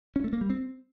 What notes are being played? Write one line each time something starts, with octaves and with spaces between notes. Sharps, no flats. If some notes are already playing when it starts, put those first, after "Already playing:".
C#4
A3
A#3
G3
C4